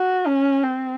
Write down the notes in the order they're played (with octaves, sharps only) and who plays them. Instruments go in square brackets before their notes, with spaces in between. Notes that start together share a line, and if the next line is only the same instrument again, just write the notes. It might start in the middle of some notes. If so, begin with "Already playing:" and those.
Already playing: [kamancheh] F#4
C#4
C4